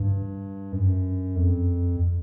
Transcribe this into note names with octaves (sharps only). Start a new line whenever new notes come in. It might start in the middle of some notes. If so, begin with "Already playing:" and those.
Already playing: G2
F#2
F2